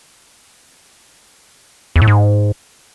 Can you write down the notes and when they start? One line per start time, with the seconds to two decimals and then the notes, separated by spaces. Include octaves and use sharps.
1.96 E2
2.02 A2
2.07 G#2